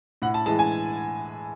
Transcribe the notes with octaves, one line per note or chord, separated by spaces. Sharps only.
A2 F#5
A5
E3 G#3 A5
G#5